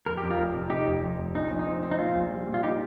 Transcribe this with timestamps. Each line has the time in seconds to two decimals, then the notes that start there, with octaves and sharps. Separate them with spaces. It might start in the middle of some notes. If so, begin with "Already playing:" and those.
0.06 F2 A#4
0.17 F2 G4
0.30 F4 A#4
0.38 F1
0.54 C3
0.70 C3 D#4 G4
0.87 F1
1.03 F2
1.18 F1
1.34 A#1 D#4
1.50 A#1
1.59 D#4
1.67 C4
1.83 C4
1.91 D#4
1.99 A#2 F4
2.15 A#1
2.31 G3
2.47 A#2
2.54 F4
2.63 D#4 G4